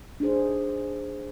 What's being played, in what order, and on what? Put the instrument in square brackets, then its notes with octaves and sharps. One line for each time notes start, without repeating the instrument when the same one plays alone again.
[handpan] D4 D#4 G#4 C5